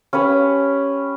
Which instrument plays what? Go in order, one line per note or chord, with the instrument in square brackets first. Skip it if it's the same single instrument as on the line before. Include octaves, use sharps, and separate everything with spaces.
[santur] C#4 G4 B4 C#5